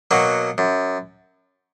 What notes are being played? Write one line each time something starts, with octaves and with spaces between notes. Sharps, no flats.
B2 F#3 A#3
F#2